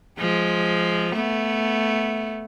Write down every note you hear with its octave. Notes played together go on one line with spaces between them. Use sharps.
F3 G#3
A3 B3